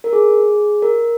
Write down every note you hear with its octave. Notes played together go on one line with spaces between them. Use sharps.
A#4
G#4
A#4